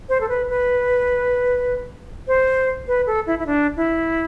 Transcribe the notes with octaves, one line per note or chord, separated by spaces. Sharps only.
C5
A4
B4
B4
C5
B4
A4
E4
E4
D4
E4